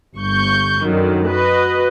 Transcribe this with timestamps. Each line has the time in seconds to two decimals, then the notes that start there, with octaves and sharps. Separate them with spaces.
0.16 G1 C#6 G6
0.87 F#2 D3 D#3 F#3
1.28 F#4 B4 D#5